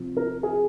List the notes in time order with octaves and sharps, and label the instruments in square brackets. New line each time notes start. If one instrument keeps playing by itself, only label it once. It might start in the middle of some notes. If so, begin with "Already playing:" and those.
Already playing: [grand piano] C3 F3
A#4
G#4